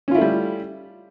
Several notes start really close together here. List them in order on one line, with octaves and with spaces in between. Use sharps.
C#4 F4 E4 A3 G3